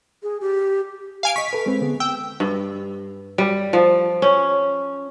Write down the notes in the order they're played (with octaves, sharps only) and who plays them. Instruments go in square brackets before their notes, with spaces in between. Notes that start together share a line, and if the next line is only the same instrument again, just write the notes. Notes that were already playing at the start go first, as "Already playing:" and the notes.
[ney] G#4
G4
[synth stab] F5 G#5 D7
[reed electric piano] D#5 C#6 [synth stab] B6
[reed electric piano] A4 B4
G#3 C4 B4
D3 B3 G#4
[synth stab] G5 [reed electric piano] E6
[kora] G2
G3
F3
C#4